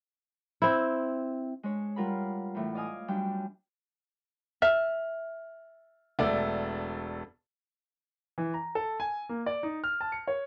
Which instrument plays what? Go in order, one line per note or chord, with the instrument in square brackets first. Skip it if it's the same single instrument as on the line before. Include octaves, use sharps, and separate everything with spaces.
[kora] C4 E4
[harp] G#3 D4 C#5
G3 F4 A#4 F#5 B5
E2 A2 E3
D5 D#5 F5 G#5 D#6
F#2 G3 D4 G5
[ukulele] E5 [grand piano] F6
[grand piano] E1 A3 D5
E3
A#5
A4
G#5
A#3
D5
D#4
F6
A5
C#7
C#5